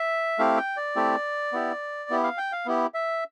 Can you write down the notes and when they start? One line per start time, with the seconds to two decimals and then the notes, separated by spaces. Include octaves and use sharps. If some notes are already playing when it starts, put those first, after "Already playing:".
Already playing: E5
0.39 A3 C4 E4 G4 F5
0.57 G5
0.77 D5
0.96 A3 C4 E4 G4
1.53 B3 E4 G4
2.10 B3 E4 G4
2.24 F5
2.38 G5
2.52 F5
2.66 B3 E4 G4
2.94 E5